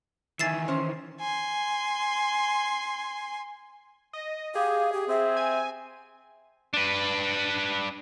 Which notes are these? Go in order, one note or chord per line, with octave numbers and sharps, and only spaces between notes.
D#3 E3 E5 G#5 A6 C7 E7
C#4 C5
G#5 C6
D#5
G4 G#4 F5
G4
C4 E5
G#5
D4 B4